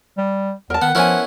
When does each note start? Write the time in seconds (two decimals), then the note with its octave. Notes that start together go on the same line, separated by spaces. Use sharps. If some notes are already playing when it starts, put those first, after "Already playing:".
0.18 G3
0.70 E2 A#4 A5
0.82 D#3 B3 F#5
0.95 F3 B3 C#4 E4 A#4 G#5